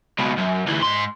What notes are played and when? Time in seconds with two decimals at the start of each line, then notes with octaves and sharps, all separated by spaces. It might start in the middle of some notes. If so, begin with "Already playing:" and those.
0.18 C#2 B2
0.38 F#2
0.67 D2 E3
0.83 G#2 C6